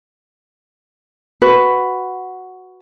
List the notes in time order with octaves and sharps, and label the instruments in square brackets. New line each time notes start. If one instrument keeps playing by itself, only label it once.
[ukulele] F#4 B4